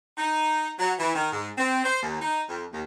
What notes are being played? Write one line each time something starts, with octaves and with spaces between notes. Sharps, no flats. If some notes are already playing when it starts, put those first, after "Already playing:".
D#4
F#3
E3
D#3
G#2
C4
C5
D#2
D#4
F2
D#2